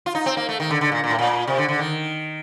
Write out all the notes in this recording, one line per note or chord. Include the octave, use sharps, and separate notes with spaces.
F4
D#4
C4
A#3
A3
D#3
D3
D3
A#2
A#2
A2
A#2
C3
D3
D3
D#3